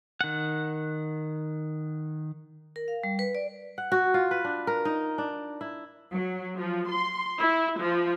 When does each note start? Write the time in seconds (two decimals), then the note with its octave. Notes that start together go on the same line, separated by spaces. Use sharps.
0.21 D#3 F#5
2.76 A#4
2.88 F5
3.04 G3
3.19 B4
3.35 D5
3.78 F#5
3.92 F#4
4.14 F4
4.31 B4
4.44 D4
4.67 A#4
4.85 D#4
5.18 D4
5.61 E4
6.12 F#3
6.57 F3
6.88 C6
7.40 E4
7.80 F3